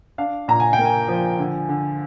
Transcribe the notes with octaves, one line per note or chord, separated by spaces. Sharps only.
D4 F5
A#2 A#5
G#5
G5
A#3
G#5
F3
D3
D3